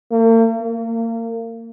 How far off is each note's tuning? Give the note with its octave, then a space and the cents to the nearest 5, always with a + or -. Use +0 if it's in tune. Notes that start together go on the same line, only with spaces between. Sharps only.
A#3 -45
A#3 -30